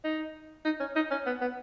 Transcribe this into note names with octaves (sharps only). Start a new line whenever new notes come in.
D#4
D#4
C#4
D#4
C#4
B3
B3